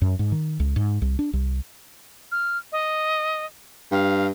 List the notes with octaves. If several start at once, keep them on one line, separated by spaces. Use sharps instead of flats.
F#2
G#2
D#3
C#2
G#2
C2
D4
C2
F6
D#5
G2 F5